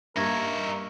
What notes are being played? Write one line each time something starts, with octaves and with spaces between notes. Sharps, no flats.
G2 A#3 D#4 A#4 E5 C#6 G#6 A#6